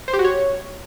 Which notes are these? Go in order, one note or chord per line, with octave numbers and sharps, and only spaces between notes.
C5
G4
F#4
C#5